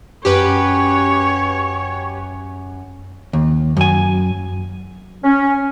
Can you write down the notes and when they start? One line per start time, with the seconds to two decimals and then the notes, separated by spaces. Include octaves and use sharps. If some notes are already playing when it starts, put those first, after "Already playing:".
0.25 F#2 G4 B4 C#5
3.33 D#2
3.77 F#2 G#5
5.23 C#4